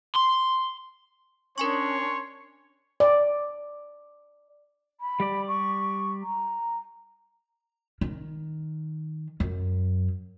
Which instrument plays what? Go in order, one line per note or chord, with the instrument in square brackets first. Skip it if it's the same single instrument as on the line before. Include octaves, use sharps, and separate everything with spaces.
[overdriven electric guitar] C6
[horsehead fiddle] C#4 D4 [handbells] A#4 G#5 C#6 [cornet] C#5 [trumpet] C6
[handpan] D5
[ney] B5
[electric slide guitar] G3 G4 D5
[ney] C#6
A#5
[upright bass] D#3
F#2